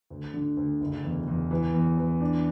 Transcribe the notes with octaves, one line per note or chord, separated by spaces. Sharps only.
D2
D3
D2
F#1
E2
E2
E3
E2
E3
D4